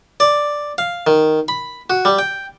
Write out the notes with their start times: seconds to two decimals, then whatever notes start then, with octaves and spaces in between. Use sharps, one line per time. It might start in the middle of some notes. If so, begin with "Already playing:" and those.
0.20 D5
0.78 F5
1.07 D#3
1.48 B5
1.90 F#4
2.05 G3
2.19 G5